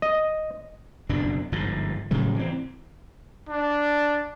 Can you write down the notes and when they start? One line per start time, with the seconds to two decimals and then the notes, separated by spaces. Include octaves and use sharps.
0.02 D#5
1.09 F#1 F2 B2 D4
1.52 G1 G#2 F3
2.11 A2 C#3 F#3 G3
2.36 E3 C4
3.49 D4